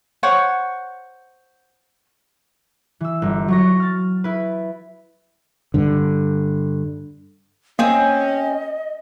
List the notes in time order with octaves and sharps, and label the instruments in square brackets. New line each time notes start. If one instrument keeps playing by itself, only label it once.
[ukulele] C5 C#5 F#5
[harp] E3 E6
G1
F#3 C#6 A#6
F6 A6
E4 B4
[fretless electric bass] G2 D3
[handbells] A#3 [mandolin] C4 G#4 [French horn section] C#4 [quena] D#5